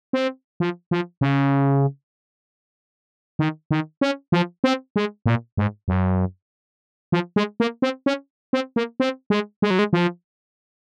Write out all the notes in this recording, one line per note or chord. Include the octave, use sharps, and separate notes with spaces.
C4
F3
F3
C#3
D#3
D#3
C#4
F3
C4
G#3
A#2
G#2
F#2
F3
G#3
A#3
C4
C#4
C4
A#3
C4
G#3
G#3
F#3
G#3
F3